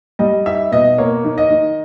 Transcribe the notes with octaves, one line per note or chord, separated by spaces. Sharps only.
G3 D#5
D#4 E5
B2 D#5
A#3 C#5
D#3
D#5
D#3